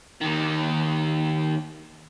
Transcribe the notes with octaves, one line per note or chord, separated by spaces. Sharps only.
D#2 D#3